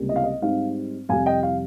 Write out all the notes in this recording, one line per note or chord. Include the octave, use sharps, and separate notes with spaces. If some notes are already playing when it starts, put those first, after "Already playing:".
Already playing: C#2 C3 G3 A#3
D#5
F5
D#5
G#2 G3 C4 D#4 F5
F2 C3 G3 F5 G#5
D#5 G5
F5